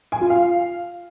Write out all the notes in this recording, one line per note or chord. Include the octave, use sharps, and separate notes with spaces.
G#5
F4
F5